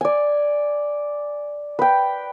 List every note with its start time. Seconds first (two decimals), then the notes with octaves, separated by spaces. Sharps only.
0.01 D5 G#5
1.79 B4 G5